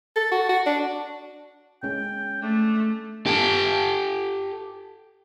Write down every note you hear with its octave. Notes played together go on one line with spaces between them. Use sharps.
A4
F#4
F#4
D4
G#3 C#4 G5
A3 D4
G4 A4